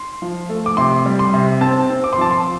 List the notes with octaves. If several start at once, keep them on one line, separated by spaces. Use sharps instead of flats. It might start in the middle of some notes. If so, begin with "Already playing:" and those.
Already playing: C6
F3
A3
D6
C3 C6
G3
C6
C3
C4 A5
C4
D6
C6
F3 A5
C6